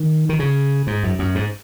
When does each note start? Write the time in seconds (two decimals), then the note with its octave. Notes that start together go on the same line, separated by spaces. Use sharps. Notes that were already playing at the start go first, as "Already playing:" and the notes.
Already playing: D#3
0.29 D#3
0.39 C#3
0.87 G#2
1.04 F#2
1.19 F#2
1.35 G#2